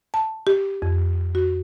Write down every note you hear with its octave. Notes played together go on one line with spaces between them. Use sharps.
A5
G4
F2
F#4